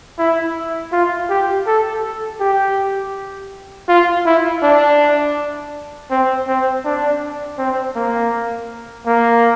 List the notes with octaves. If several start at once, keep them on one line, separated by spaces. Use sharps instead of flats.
E4
F4
G4
A4
G4
F4
E4
D4
C4
C4
D4
C4
A#3
A#3